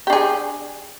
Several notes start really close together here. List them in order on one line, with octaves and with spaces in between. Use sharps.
G4 D4 G#4